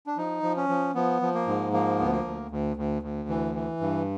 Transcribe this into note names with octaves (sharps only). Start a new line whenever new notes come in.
D4
F3 D#4
F3
C#4
F3
F3 B3
F3
A#3
G#2
F3 A#3
D2 B3
A#3
D2
D2
D2
D2
E3
E3
G2